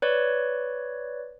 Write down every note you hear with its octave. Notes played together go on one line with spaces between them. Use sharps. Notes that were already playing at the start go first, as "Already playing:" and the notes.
B4 C#5 D5